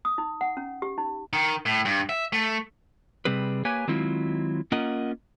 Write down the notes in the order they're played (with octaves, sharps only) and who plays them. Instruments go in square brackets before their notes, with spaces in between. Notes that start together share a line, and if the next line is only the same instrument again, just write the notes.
[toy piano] D#6
D#4
F#5
C#4
G4
D#4
[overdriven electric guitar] D#3
A2
G2
E5
A3
[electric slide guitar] C3 G3 C4 G#4 B4
A#3 G4 B4 C#5 G#5
D#3 F#3 G#3 C4 E4 F4
A#3 C#4 F4 A#4 D#5 F#5